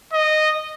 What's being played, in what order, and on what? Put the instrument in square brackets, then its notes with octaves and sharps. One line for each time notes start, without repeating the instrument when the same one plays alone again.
[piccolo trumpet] D#5